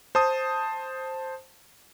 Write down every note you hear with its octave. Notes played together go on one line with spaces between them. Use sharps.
C5 A5 D#6